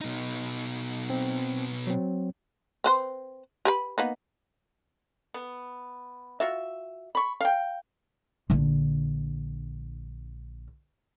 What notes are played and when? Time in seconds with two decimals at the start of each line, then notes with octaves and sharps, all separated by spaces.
0.01 B2 D#4
1.10 C4
1.87 F#3 C4
2.84 C4 B4 C5
3.65 G4 B4 B5
3.98 A#3 B3 D#4
5.34 B3
6.40 F4 F#4 E5
7.15 B5 C#6
7.41 F5 G5
8.50 A#1 D3